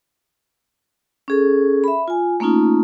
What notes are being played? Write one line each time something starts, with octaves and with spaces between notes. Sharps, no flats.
C#4 G#4 A4
E5 B5
F4 G#5
A3 A#3 C#4 D#4 F4